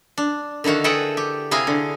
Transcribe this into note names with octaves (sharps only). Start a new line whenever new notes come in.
D4
D3 D#3 E4 F#4 F5
G#4 A4 B4 E5 F#5 G5
G4
C3 E4 G#4 F5 G#5 A#5
D3